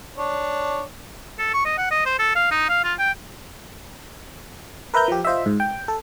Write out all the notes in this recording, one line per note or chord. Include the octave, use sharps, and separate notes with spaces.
D4 C#5
A4
C#6
D#5
F#5
D#5
C5
A4
F5
D#4
F5
F4
G5
A#4 B4 E5 A#5 G6
F3 G4
F4 C5 D#5 E5
G#2
G5
A4